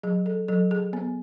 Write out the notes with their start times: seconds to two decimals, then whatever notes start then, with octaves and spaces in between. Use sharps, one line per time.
0.03 F#3 G#4
0.26 A4
0.48 F#3 A4
0.71 G#4
0.93 B3